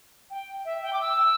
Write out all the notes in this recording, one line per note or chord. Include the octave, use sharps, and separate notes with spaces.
G5
E5
G5
D6
E6